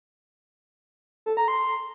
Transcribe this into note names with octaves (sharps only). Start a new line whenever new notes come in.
A4
A#5
C6